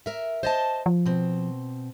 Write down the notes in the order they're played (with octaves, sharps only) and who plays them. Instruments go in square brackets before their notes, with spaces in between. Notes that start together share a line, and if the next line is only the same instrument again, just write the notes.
[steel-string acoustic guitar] A#4 E5
C5 D#5 A5
[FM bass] F3
[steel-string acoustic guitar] B2 C4